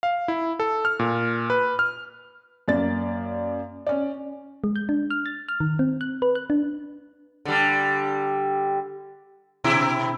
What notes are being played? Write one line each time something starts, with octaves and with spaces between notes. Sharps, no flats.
F5
E4
A4
F6
A#2
B4
F6
F#2 A#3 D5 A6
C#4 D5
G#3
G6
D4
F6
A6
F6
D#3
C4
F#6
B4
F#6
D4
D3 G3
B2 E4